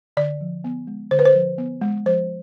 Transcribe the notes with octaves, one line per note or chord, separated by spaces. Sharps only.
D3 D5
F3
B3
G#3
D3 C5
B4
C5
F3
B3
G#3
F3 C5